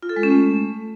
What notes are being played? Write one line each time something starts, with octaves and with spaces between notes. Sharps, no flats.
F4
A4
G#3
C#4
A3